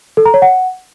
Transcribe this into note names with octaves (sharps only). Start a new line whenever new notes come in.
A4
A#5
C#5
F#5